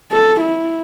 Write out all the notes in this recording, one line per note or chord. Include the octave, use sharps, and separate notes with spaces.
A4
E4